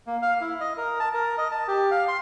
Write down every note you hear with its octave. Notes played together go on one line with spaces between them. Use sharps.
A#3
F5
E4
D#5
A#4
A5
A#4
D#5
A5
G4
F5
C6